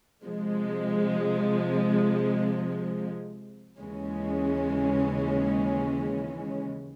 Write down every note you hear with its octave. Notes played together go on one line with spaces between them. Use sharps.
C3 F3 G#3
D#2 C#3 E3 G#3 C#4